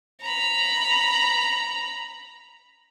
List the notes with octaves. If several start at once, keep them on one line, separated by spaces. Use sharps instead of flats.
A#5 B5